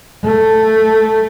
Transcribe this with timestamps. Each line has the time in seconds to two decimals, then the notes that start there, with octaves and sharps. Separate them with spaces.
0.24 A3